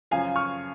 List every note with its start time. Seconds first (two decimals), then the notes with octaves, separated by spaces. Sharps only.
0.11 F#2 C#3 F3 F5 G#5
0.36 C#6 F6